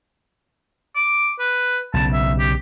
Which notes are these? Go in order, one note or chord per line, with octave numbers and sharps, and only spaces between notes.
D6
B4
B1 C#3 A5
E5
G4